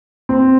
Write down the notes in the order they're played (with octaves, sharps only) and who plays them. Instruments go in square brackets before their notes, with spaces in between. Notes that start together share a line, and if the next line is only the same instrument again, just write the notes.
[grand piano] C4